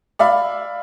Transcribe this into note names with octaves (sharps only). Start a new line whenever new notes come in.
D5 E5 F5 B5